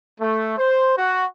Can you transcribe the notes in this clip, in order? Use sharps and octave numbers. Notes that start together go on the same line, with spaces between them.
A3
C5
F#4